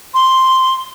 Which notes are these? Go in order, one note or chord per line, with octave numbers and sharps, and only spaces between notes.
C6